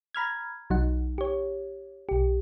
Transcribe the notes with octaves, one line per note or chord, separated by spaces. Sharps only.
A#5 B5 F6 G#6
B1 F#3 D#4 F#5
G4 C#5
B1 G4